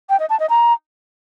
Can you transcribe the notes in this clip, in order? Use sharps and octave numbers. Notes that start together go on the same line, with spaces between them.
G5
D#5
A5
D#5
A#5